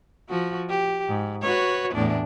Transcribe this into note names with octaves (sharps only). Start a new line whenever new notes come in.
F3 F#4
G4
G#2
F#4 B4 C#5
E2 A2 D4